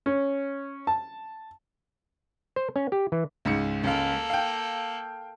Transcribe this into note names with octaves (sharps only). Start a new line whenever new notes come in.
C#4
A5
C5
C#4
G4
E3
C#2 G#2 C#7
C#2 A#3 A4 F5
F5 G5